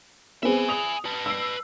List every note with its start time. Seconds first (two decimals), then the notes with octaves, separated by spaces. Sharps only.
0.43 B3 C4 G#4 E5 G#5
0.69 D#6 F7
1.05 B4 A5
1.26 E6 C7